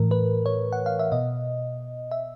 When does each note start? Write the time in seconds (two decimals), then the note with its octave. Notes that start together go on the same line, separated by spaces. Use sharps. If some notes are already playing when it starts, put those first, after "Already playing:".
Already playing: A2 E3 A#4
0.11 B4
0.46 C#5
0.73 F#5
0.86 F5
0.99 E5
1.12 B2 D#5
2.11 E5